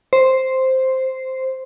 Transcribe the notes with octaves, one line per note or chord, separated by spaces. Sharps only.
C5